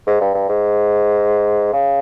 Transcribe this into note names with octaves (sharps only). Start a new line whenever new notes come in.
G#2
G2
G2
G#2
C#3